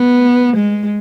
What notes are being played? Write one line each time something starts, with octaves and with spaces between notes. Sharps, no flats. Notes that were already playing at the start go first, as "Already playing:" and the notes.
Already playing: B3
G#3